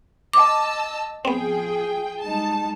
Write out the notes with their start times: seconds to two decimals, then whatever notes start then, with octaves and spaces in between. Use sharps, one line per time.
0.33 D#5 A5 D6 E6
1.25 F3 B3 C4 G#4 G5
2.21 G3 G#3 D#4 A5